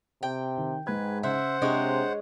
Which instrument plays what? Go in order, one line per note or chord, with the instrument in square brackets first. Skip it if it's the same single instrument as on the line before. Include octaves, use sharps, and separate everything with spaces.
[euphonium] C3 [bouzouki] G5
[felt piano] D#3
[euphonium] G#2 [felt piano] G#3 G#6 [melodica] B4
[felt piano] C#3 [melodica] C5 F#5 [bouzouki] E5
[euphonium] C3 [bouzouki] G#3 C#5 D#5 [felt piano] D4